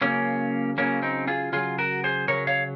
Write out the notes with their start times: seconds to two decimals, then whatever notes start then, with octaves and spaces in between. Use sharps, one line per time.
0.01 C#3 F#3 A#3 C#4
0.78 C#3 F#3 A#3 C#4
1.02 C4 D#4
1.28 F4 G#4
1.52 C#3 F#3 F4 G#4
1.78 F#4 A#4
2.04 G#4 C5
2.28 C#3 F#3 A#4 C#5
2.47 C#5 F5